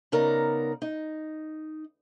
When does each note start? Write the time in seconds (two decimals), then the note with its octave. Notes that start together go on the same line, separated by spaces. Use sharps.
0.12 C#3 B3 D#4 A#4 D5
0.82 D#4